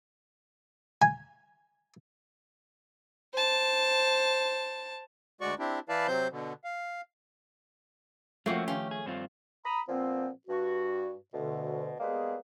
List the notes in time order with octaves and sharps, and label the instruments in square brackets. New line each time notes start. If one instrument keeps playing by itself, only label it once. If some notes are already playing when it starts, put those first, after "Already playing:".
[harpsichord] G#5
[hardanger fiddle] C5 A5
[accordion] D2 G#3 F#4 D5 C#6
C4 D4 E4 G4
E3 E4 B4 D5 F5 A5
C3 F#3 C4 C5 G6
B2 D3
F5
[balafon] F3 F4 E5 [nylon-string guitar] A3 [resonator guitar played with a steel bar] A#3 C4 [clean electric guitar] C#4 F#4
[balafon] D#3 F5 [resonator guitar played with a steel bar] C#4 [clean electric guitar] G4
[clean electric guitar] G#4
G2 C4 F4
[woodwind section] A#5 B5 D#6
A#2 F3 B3 C4
G2 F#4
D2 B2 D3
G3 G#3 A#3 B3 G#4 B4